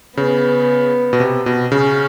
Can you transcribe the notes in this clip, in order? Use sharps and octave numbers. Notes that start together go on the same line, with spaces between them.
C#3 B3
B2
C3
B2
C#3 C#4